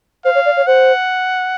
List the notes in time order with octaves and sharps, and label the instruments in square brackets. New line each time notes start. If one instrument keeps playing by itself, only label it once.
[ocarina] C5 [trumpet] F5
[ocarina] C#5
D5
C#5
[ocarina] C5 [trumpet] F#5